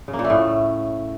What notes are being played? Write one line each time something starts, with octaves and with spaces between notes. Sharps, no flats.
C#3
A#3
A#2
A3
A2